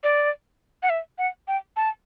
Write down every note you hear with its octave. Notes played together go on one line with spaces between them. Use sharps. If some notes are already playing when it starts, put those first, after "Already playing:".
D5
F#5
E5
F#5
G5
A5